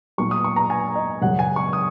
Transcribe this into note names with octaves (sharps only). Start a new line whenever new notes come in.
A#2 F#3 C#6
D#6
C#6
A#5
G#5
D#5
F#2 C#3 F#3 F#5
G#5
C#6
D#6